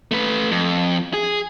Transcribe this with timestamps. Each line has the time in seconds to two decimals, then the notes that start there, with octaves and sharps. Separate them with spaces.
0.11 A3 B4
0.51 F2
1.14 G#4